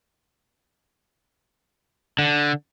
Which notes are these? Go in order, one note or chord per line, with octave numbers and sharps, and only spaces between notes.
D3